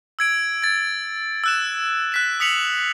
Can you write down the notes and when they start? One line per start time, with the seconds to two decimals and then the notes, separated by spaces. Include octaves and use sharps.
0.19 E6 G#6 D7
0.62 G#6 A6
1.44 E6 F#6 E7
2.12 F#6 B6 E7
2.40 D#6 B6 C#7 F7 F#7